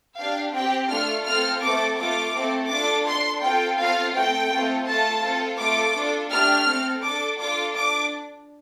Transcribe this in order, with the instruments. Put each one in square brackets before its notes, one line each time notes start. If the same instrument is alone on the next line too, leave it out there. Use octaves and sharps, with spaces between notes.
[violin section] D4 G4 F5
C4 G4 G5
A3 D4 F4 A4 F6
C4 F4 A4 F6
A3 C4 A4 D6
A3 F4 A4 D6
A3 C4 A4
D4 F4 A4 D6
D4 A4 C6
C4 F4 A4 G5
C4 F4 A4 F5
A3 C4 A4 G5
A3 C4 F4 A4
A3 F4 A4 A5
C4 F4 A4
A3 F4 A4 D6
D4 F4 A4
A3 D4 G4 F6
C4 A4
D4 A4 D6
D4 F4 A4 D6
D4 D6